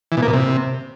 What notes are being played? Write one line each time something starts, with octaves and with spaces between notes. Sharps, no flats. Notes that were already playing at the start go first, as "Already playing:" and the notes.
E3
B2
A#3
B2
C3